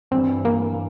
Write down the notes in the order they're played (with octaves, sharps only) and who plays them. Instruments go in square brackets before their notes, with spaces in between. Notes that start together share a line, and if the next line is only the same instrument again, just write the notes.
[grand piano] G2 E3 G3 [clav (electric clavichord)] C4
[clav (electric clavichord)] A#3